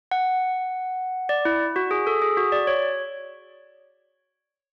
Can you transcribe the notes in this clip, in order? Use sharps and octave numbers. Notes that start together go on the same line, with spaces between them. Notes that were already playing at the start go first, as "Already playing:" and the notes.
F#5
D5
E4
F#4
G#4
A4
G#4
F#4
D5
C#5